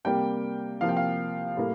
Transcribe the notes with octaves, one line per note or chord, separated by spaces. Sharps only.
C3 G3 A#3 G5
C3 F3 A#3 F5
G5
F5
A2 G3 A#3